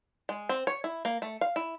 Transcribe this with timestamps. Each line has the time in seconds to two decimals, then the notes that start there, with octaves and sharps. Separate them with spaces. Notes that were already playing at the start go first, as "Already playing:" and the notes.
0.29 G#3
0.49 C4
0.67 C#5
0.84 E4
1.05 A#3
1.22 A3
1.41 F5
1.56 E4